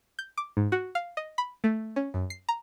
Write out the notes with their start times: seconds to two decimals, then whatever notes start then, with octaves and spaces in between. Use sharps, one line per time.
0.19 G6
0.37 D6
0.57 G#2
0.72 F#4
0.95 F5
1.17 D#5
1.38 B5
1.64 A3
1.96 C#4
2.14 F#2
2.30 C7
2.49 A#5